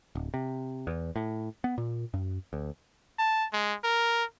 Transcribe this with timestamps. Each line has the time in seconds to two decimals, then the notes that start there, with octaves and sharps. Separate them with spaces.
0.15 D1
0.34 C3
0.87 E2
1.16 A2
1.64 B3
1.78 A#2
2.14 F#2
2.53 D2
3.19 A5
3.53 G#3
3.84 A#4